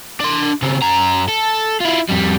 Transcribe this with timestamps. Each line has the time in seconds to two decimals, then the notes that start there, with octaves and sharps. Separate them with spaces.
0.20 D4 C6
0.62 C#3 C4
0.82 F#2 A#5
1.28 A4
1.80 E4 F4
2.09 F2 G3